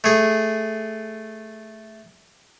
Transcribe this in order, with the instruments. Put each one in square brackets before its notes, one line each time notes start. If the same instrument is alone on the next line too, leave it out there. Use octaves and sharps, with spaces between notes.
[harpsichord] A3 G#4